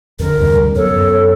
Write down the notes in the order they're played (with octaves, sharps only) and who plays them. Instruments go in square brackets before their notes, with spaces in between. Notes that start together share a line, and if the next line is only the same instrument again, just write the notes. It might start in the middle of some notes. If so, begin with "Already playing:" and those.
[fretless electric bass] F2 D3 [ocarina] A#4
[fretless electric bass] D2 C3 G3
[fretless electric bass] F#2 F#3 B3 [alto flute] A4 [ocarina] C#5